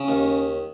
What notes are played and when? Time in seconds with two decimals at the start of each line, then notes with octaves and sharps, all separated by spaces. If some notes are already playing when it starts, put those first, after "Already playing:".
Already playing: C#3
0.08 D#2